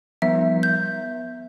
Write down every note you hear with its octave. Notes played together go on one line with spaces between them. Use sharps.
F3 G3 B3 E5
G6